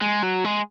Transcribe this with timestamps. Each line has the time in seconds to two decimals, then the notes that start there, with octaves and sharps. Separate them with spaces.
0.02 G#3
0.23 F#3
0.45 G#3